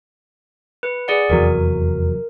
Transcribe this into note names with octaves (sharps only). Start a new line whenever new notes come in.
B4
G#4 D5 F#5
F1 E2 F#3 A#4